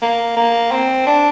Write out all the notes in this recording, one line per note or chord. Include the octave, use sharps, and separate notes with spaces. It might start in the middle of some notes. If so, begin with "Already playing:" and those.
A#3
A#3
C4
D4